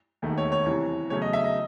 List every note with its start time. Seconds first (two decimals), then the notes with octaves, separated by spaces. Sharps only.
0.22 E1 D#2 D#3 A3
0.38 C#5
0.52 C#5
0.66 C2 C3 E3 C#5
1.10 E2 C#3 F#3 A3 C#5
1.22 D#5
1.33 E5
1.44 D#5